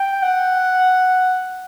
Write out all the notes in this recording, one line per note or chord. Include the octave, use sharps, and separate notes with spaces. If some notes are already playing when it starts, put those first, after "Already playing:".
Already playing: G5
F#5